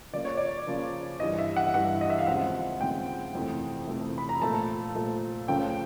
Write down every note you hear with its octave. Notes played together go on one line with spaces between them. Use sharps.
C#3 F3 A#3 D5
C#5
D5
C#3 F3 A#3
G2 E3 G3 D#5
E5
F#5
G2 E3 G3 F#5
D#5
E5
F5
D#2 C#3 F3 G#3 C4 F#5
D#2 C#3 F3 G#3 C4 G5
F2 C3 E3 A3
F2 C3 E3 A3
B5
A#5
A#2 F3 A3 A5
A#2 F3 A3
C#2 C#3 F3 A3 C#4 G5